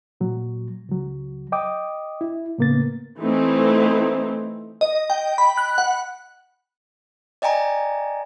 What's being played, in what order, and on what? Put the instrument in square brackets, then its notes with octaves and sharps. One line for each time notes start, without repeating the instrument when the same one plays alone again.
[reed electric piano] A#2 F#3
C#2 F#3
D#5 G5 D6 D#6
E4
A2 C#3 A#3 B3 A6
[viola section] E3 A3 C4 D#4
[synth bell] D#5
G5
B5
F#6
F#5
[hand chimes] D5 D#5 G5 G#5 A#5